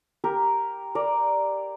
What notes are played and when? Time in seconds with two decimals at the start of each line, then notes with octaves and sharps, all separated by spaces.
0.24 G4 A#4
0.95 A#4 D5